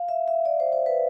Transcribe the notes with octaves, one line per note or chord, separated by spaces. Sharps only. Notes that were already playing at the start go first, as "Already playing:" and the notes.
Already playing: F5
E5
E5
D5
C5
C5
B4